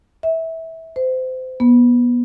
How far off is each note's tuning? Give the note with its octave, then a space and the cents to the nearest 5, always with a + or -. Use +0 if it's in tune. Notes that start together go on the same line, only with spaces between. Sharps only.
E5 -20
C5 -30
B3 -25